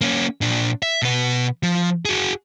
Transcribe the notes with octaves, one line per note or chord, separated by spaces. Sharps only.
A#3 C#4
A#2 D4
E5
B2 B4
F3
F#4 G#4